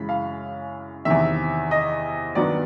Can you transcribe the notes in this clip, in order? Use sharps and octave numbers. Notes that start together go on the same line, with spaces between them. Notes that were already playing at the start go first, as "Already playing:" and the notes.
Already playing: F#2 C#3 E3 G#3 B5
F5
E2 C3 D#3 E5
D#5
G2 D#3 F#3 B3 D4 D5